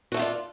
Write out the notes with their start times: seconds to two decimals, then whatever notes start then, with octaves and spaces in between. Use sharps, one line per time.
0.12 F#4
0.14 A3
0.17 B3
0.19 F4
0.22 D4